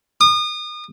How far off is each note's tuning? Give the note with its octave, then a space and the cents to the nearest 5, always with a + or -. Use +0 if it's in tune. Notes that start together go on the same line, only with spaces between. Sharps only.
D#6 -35